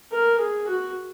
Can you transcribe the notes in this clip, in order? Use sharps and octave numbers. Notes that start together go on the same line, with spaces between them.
A#4
G#4
F#4